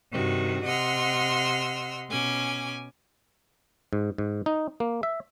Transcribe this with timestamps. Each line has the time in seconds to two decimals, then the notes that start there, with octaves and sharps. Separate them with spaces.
0.13 G2 C3 D#3 F#4
0.65 C3 D#5 F#5 C6 E6 F6
2.10 B2 C#4 G#5 D6
3.93 G#2
4.18 G#2
4.46 D#4
4.80 A#3
5.03 E5